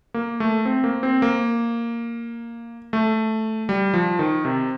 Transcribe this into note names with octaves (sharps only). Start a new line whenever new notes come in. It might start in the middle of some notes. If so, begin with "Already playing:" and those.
A#3
A3
C4
A#3
C4
A#3
A3
G3
F3
D#3
C3